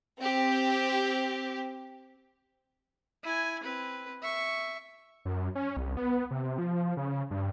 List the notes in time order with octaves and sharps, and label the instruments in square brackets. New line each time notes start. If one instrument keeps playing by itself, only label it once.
[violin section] C4 G4
[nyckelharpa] E4 G#5
C4 B4
E5 C#6
[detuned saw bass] F#2
C#4
C2
B3
C3
F3
C#3
G2